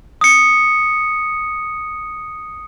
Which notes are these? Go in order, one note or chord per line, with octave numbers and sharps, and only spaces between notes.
D#6 C#7